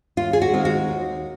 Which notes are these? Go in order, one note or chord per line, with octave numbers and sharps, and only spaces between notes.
D#2 F4
G#4
F#4
D#3 G#3 C4 F4
F#4
D#2